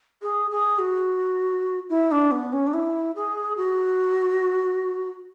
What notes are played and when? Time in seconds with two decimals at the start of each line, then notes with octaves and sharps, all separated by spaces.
0.22 G#4
0.51 G#4
0.79 F#4
1.90 E4
2.11 D4
2.31 B3
2.53 C#4
2.67 D4
2.74 E4
3.16 G#4
3.57 F#4